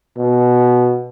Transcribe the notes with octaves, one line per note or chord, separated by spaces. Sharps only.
B2